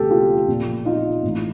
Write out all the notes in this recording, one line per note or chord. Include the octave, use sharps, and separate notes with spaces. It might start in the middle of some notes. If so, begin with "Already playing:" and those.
Already playing: E1 D2 C#3 G4 A4
F4 G4
A#1 A#2
D#4 F4
A1 A2 E3